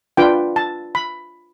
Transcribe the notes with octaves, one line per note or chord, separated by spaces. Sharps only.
D4 F4 B4 G5
A5
B5